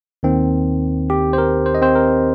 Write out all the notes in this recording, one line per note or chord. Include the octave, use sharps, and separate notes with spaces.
D#2 D#3 C4
G4
C5
A#4
C5
D#5
C4 C5
A#4